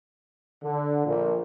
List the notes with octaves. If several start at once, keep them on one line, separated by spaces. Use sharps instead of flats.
D3
A#1 A#2